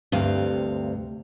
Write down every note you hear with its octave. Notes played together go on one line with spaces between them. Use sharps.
D2 G2 C3 F5